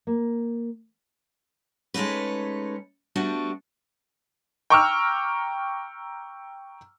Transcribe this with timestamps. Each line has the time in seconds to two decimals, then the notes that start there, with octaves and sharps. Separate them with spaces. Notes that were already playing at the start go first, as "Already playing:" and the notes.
0.07 A#3
1.94 G#3 A3 C#4 D#4 B4
3.16 G3 A3 B3 D4 F#4
4.70 G5 A#5 C#6 D6 E6 F6